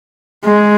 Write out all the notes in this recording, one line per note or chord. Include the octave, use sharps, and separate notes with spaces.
G#3